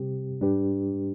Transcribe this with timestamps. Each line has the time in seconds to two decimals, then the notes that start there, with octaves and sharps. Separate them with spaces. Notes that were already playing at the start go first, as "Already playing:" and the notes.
Already playing: C3 G3 C4 G4
0.41 G#2 G3 D4 G4 B4